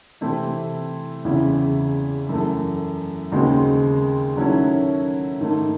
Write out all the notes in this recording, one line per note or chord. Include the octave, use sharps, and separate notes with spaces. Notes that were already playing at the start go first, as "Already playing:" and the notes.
C3 E3 A3 C4 E4
E2 C#3 E3 C4 E4
F#2 E3 A3
D#2 C#3 G#3 C4 F#4
D#3 F#3 A3 C#4 E4
G#2 D#3 A3